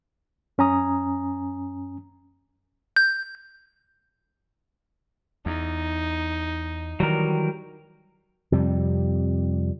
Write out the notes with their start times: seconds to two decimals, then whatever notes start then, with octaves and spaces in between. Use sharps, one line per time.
0.58 F#2 C#4 G#5 A#5 D#6
2.96 G6
5.46 E2 D#4
7.00 D#3 E3 F#3 G3 A#4
8.52 F2 C3 G3